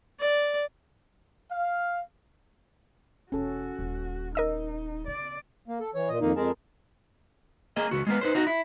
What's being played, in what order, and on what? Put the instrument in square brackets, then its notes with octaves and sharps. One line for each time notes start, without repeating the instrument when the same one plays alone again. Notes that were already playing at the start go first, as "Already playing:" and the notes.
[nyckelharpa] D5
[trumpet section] F5
[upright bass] E1 [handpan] C#4 A4 [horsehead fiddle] F#4
[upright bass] D#1
[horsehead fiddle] D#4 [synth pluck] A#4 D#5 E6
[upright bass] C#3 [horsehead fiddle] D5
[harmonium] A#3
A4
E3 C#5
A#2 D#5
F2 D#3 A#3 D#4
F2 G#3 G#4 A#4 A5
[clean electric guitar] A#3 G#4 D#5
C#2 F#4
G#3 A#3 B3
D#4 B4 C5
D#4 F#4
E4